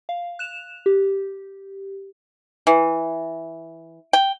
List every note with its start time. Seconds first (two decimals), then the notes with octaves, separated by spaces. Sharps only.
0.09 F5
0.39 F#6 E7 F7
0.86 G4
2.67 E3
4.13 G5